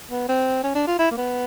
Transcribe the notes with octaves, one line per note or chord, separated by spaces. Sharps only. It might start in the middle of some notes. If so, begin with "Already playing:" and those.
B3
C4
C#4
D4
F4
E4
A#3
B3